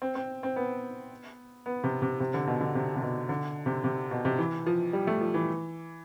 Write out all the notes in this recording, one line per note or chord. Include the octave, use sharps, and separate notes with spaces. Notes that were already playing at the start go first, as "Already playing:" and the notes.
C4
C4
C4
B3
B3
C3
C3
C3
D3
B2
D3
C3
C3
B2
D3
C3
C3
B2
C3
E3
F3
G3
A3
F3
E3